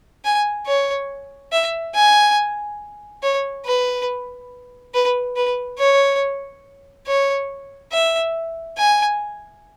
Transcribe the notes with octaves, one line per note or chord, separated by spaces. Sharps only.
G#5
C#5
E5
G#5
C#5
B4
B4
B4
C#5
C#5
E5
G#5